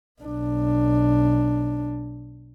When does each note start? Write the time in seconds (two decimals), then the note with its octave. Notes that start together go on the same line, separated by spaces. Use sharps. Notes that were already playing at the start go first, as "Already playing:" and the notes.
0.21 B1 D4